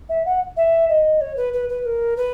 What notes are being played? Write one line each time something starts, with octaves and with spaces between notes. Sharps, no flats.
E5
F#5
E5
D#5
C#5
B4
B4
B4
A#4
B4